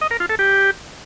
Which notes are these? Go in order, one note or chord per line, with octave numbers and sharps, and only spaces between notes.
D#5
A#4
F4
A4
G4